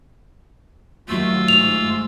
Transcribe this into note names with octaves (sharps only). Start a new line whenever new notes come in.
D#2 F#3 A3 F4 F#4 E6
G#2 F7